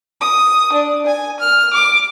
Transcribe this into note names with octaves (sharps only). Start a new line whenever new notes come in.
D#6
D4
G#5
F6
D6